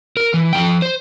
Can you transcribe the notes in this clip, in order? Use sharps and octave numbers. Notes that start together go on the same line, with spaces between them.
A#4
E3
F3 G5
C5